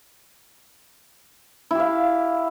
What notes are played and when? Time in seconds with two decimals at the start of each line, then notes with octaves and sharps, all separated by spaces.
1.71 E4
1.75 G4
1.80 F5